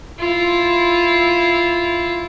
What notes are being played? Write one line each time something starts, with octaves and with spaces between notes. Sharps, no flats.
E4 F4